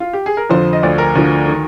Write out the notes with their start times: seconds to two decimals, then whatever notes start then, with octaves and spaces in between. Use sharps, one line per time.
0.00 F4
0.13 G4
0.26 G#4
0.37 A#4
0.50 F2 D3 F3 C5
0.73 D#5
0.83 D2 D3 F3 D5
0.98 A#4
1.15 D2 D3 F3
1.48 D#3